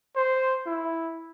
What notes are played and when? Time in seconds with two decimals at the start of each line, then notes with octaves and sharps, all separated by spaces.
0.15 C5
0.66 E4